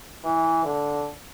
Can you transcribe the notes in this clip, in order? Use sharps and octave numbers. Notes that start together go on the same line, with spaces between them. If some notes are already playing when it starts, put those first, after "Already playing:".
E3
D3